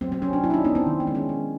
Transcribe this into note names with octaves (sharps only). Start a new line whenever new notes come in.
F#3 C4
C4
F#3 C#4
D4
F#3 E4
D4
D#4
B3 D4
C4
D#3
C4
G#3
C#4
G#3